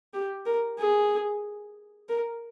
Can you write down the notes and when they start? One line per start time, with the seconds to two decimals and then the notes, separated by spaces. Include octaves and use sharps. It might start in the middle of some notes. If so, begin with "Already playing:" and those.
0.14 G4
0.46 A#4
0.78 G#4
2.09 A#4